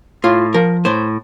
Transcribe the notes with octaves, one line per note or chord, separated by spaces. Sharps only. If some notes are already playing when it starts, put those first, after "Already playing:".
A2 F4
F3 A#4
A2 C5